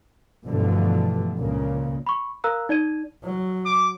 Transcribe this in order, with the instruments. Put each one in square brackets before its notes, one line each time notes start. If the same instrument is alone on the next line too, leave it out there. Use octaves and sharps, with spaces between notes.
[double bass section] G2 B2 D3 E3 F3 A3
C#2 A#2 C#3 A#3
[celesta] B5 C#6
A#4 F5 A#5 E6 F#6
D#4 D5 G#6 D#7
[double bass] F#3
[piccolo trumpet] D6